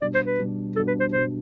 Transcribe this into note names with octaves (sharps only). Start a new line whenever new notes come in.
B2 G3 D4 D5
C5
B4
B2 G3 D4
B2 G3 D4 A4
B4
C5
B2 G3 D4 C5